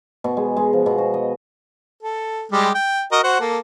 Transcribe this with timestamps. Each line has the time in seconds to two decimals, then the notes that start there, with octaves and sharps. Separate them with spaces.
0.24 B2
0.37 G#3
0.57 G#3
0.73 F3
0.86 B2
0.98 F#4
1.14 D#5
2.03 A4
2.52 G3 G#3 G4
2.74 G5
3.12 F#4 A#4 D#5
3.24 F#4 C5 F#5
3.40 A#3 A4